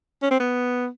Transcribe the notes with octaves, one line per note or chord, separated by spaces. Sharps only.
C#4
C4
B3